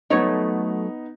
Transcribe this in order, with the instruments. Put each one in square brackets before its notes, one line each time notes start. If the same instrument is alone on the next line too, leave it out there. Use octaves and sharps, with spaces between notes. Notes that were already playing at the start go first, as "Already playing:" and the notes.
[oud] F#3 A3 C#5 [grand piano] B3 D#4